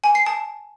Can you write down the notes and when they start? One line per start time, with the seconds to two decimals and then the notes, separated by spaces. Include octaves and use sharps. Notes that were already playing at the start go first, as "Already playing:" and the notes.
0.04 G#5
0.15 C7
0.26 A5